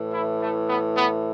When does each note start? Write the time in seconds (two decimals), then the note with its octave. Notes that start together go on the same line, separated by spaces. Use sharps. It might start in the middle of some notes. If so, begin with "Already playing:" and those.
Already playing: A2 E3
0.13 E4
0.42 A3
0.69 B3
0.97 B3